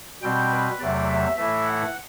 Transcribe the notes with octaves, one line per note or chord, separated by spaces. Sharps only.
B2 G3 C4 G5
B4
E2 C3 F#3 A3 D5
E5
A2 E3 A3 E5
F#5